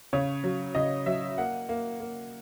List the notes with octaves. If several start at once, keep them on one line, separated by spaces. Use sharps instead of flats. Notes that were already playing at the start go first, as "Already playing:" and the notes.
C#3 C#5
F#3
C#3 D#5
F#3 E5
A#3 F#5
A#3
A#3